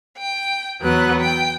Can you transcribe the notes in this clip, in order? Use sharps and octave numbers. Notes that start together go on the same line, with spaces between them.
G5
E2 F#3 B3 F#6
G5